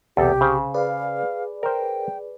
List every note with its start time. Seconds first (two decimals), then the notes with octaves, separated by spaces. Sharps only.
0.17 B1 E2 C3 G4 A4
0.41 C#3 C5
0.74 G#4 B4 D5 F5
1.63 A#4 C5 G5